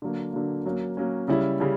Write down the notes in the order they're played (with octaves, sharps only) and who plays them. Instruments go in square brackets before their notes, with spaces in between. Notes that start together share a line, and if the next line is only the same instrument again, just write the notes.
[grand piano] D3 F#3 A#3
D3 F#3 A#3
F#3 A#3 C#4
F#3 A#3 C#4
C#3 G3 C#4 E4
C#3 G3 C#4 E4